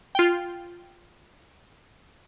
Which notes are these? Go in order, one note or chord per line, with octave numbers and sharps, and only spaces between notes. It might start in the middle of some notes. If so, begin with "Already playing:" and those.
F4 G5